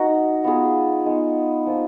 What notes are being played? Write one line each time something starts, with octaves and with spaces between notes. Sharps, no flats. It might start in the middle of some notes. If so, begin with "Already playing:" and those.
Already playing: D#4 F#4 A#4
B3 F4 G#4
G#3 B3 D#4
F3 A#3 F4